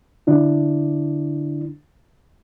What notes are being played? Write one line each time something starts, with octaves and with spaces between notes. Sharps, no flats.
D3 D4 E4